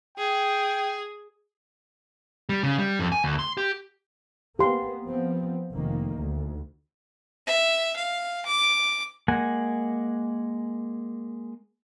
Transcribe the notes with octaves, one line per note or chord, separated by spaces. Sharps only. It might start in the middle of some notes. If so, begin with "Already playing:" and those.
G#4 G5
G3
C#3
G3
F2
G#5
D2
C6
G4
A#3 B3 G4 C6
F3 B3 C4
F1 D#3 A#3
D2
E5
F5
D6
G#3 A#3 F#5 G#5